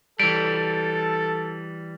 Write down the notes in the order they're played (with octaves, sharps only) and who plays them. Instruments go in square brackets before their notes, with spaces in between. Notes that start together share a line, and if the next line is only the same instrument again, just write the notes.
[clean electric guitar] E3 G3 [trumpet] A4 [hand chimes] D7